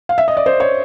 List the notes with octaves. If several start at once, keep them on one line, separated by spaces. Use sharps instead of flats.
F5
E5
D#5
D5
C5
C#5